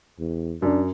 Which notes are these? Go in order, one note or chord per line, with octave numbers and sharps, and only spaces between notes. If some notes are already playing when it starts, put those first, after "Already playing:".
E2
F#2 D4